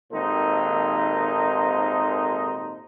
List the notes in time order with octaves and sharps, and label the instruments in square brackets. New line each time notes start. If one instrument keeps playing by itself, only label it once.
[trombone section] G#1 D#2 A#2 D#4 A4 C5